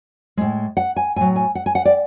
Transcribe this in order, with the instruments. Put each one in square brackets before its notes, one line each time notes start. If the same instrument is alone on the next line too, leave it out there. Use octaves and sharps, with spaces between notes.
[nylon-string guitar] A2 G#3
F#5
G#5
A2 F#3 G#5
G#5
F#5
G#5
F#5
D5